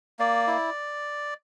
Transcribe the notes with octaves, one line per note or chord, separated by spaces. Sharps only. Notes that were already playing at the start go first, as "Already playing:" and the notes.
A#3 D5
E4